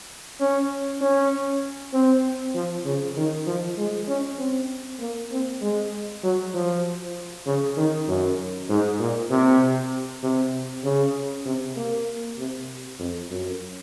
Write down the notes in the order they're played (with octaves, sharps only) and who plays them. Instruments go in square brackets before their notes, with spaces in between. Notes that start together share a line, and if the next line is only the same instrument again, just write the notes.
[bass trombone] C#4
C#4
C4
F3
C#3
D#3
F3
G#3
C#4
C4
A#3
C4
G#3
F#3
F3
C#3
D#3
F#2
G#2
A#2
C3
C3
C#3
C3
A#3
C3
F2
F#2